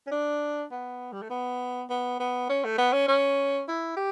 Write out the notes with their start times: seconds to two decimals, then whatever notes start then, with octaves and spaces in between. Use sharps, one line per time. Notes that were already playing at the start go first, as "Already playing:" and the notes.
0.07 C#4
0.11 D4
0.71 B3
1.13 G3
1.22 A3
1.30 B3
1.90 B3
2.20 B3
2.49 C#4
2.64 A3
2.78 B3
2.93 C#4
3.08 C#4
3.68 E4
3.97 G4